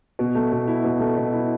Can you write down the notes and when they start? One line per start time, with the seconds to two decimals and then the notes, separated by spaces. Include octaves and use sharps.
0.19 B2
0.35 A3
0.52 B2
0.67 E4
0.84 B2
1.00 A3
1.17 B2
1.33 E4